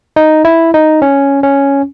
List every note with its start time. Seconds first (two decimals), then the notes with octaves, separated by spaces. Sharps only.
0.16 D#4
0.45 E4
0.74 D#4
1.02 C#4
1.43 C#4